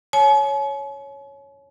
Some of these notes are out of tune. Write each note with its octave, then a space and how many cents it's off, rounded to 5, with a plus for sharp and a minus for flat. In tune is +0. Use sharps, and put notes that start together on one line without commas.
C#5 +0 G#5 +45